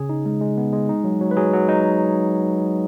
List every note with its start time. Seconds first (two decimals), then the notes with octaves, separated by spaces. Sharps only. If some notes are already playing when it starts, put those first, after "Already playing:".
Already playing: C#3 G#4
0.09 D#4
0.26 G#3
0.41 G#3
0.57 B3
0.73 G#3
0.89 D#4
1.04 F#3
1.21 F#3
1.31 B4
1.37 F#3 G#4
1.53 F#3
1.69 D#4